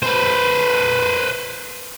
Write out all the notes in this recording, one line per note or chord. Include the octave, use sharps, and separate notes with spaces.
B4 C5